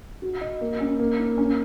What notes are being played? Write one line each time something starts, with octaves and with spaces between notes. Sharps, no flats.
F#4
D#5
A#3
C#4
A#3
D#4
C#4